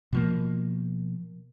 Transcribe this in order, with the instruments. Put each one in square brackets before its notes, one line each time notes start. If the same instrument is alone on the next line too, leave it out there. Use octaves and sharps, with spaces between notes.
[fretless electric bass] B2 F3 A#3